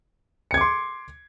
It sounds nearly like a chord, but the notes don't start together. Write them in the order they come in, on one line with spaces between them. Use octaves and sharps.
C#7 G#6 D6 C6